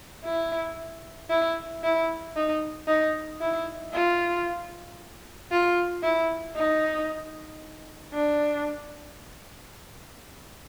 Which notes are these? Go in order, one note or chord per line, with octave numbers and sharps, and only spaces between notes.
E4
E4
E4
D#4
D#4
E4
F4
F4
E4
D#4
D4